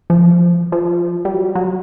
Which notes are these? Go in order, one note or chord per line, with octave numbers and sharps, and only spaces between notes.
F3
F3
G3
F#3
F#3